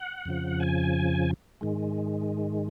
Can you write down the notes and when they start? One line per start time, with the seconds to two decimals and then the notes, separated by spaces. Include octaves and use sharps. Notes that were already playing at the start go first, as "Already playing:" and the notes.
Already playing: F#5
0.25 F2 C#3 F3
0.60 G#5
1.61 G#2 D#3 G#3